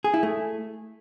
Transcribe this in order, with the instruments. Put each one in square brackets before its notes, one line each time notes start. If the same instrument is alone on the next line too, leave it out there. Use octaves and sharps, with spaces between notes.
[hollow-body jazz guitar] G#4
E4
A3